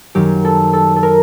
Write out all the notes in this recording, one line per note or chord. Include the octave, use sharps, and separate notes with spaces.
F#2 D#3 F#3 G4
A4
A4
A4
A#4